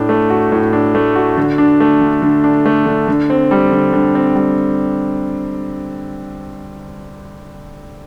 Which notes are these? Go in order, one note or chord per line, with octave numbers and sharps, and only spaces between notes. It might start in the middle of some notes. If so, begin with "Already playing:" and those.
Already playing: A2 D4
A3
F#4
A2
D4
A3
F#4
D3
D4
A3
D3
D3
D4
A3
D3
D3
C4
G3
D3
D3
C4
G3